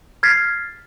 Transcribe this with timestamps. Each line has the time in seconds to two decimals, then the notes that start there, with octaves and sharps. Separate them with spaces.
0.23 F6 G#6 A6 B6 C7